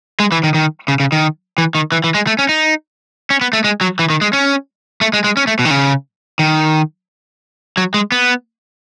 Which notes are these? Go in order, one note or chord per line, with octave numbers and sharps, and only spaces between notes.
G#3
E3
D#3
D#3
C#3
C#3
D#3
E3
D#3
E3
E3
G#3
A3
C#4
D#4
C#4
B3
A3
G#3
F#3
E3
D#3
G#3
C#4
A3
G#3
G#3
C#4
A3
B2
D#3
C#3
D#3
F#3
G#3
B3